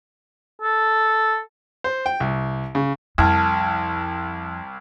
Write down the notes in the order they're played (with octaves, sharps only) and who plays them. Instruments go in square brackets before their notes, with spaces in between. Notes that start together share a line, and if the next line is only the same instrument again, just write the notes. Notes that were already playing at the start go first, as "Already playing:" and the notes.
[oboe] A4
[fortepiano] C5
G5
C2
C#3
[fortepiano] C2 [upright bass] F2 [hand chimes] A5 F6 G#6